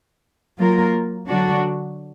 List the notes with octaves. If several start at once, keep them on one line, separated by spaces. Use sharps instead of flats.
F#3 A#3 F4 A#4
D3 F#3 D4 F#4